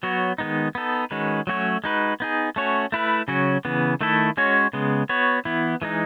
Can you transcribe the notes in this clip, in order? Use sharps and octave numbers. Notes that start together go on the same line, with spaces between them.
F#3 B3 F#4 C#5
D#3 G#3 B3 D#4
B3 D#4 A4
D#3 G#3 C#4 F#4 B4
F#3 A3 C#4 F#4 C#5
G#3 D#4 F#4 B4
B3 D#4 G#4
A3 C#4 F#4 C#5
A3 E4 B4
C#3 F#3 C#4 F#4
C#3 E3 B3
D#3 A3 E4 A4
G#3 C#4 F#4 C#5
C#3 G#3 B3
B3 F#4 C#5
E3 B3 E4
E3 G#3 D#4